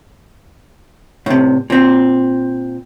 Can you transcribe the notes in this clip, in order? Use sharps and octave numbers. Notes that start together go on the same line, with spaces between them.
A2 C3
A#2 C4